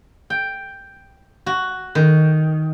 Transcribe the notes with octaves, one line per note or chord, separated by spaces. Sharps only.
G5
F#4
D#3